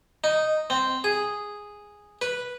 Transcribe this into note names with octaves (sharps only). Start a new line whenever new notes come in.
D#4
C4
G#4
B4